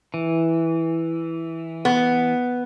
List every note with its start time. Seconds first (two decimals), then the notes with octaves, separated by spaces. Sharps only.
0.14 E3
1.85 B3